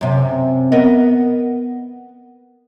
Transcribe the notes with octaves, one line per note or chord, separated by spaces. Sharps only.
F#2 C3
B3 A#4 D#5